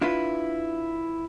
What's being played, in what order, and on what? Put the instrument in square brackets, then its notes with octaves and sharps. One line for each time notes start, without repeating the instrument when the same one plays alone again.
[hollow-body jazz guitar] D4 E4 F4 B4